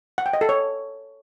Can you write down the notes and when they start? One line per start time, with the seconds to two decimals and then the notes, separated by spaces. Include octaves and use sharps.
0.18 F#5
0.26 G5
0.33 D#5
0.41 A4
0.49 C#5